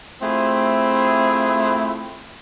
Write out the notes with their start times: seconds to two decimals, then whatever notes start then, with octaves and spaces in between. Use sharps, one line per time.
0.22 A3 C4 E4 F4 G#4